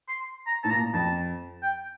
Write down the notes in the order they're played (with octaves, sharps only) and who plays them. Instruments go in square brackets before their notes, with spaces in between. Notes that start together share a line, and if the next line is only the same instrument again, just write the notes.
[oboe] C6
A#5
[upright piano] A2 [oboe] A5
[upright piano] A#2 [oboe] A#5
[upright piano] F2 [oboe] A5
[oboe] G5